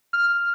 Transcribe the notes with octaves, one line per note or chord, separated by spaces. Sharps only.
F6